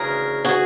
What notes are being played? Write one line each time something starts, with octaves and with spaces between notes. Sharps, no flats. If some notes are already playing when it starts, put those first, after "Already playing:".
Already playing: D2 C#3 E3 G#4 A#4
F#4 G#4